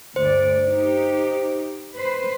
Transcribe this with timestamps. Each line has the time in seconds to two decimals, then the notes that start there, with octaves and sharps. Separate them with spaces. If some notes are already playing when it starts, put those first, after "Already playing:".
0.16 D2 G2 C5 D5
0.67 D#4 G4
1.95 B4 C5